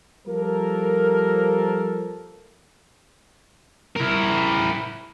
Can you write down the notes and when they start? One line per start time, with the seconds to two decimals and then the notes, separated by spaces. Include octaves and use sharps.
0.27 F3 G3 A#3 A4 A#4
3.96 E4 A#4